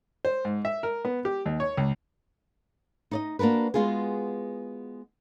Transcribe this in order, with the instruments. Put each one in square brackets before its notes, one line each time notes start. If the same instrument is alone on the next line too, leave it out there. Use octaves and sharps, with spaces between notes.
[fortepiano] C5
G#2
E5
A#4
B3
G4
D#2
C#5
C#2
[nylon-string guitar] D#4 D5 D#5
A#3 D4 F#4 A#4 B4
G#3 B3 F4 F#4 G#4